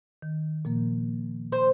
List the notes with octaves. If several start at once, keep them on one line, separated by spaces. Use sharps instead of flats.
D#3
A#2 F3 A#3
C5